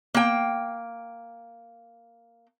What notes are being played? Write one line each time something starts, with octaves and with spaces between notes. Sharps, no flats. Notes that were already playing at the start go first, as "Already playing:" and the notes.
A#3 G5